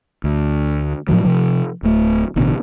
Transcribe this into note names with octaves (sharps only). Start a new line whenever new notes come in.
D2
A2 C#3 F3 F#3
C3 F3
D1 A3
A1 B2 D3